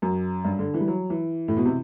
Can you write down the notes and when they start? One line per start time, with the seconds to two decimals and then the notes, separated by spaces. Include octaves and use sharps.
0.02 F#2
0.45 G2
0.59 D3
0.74 E3
0.81 G3
0.88 F#3
1.10 E3
1.48 A2
1.57 B2
1.65 C3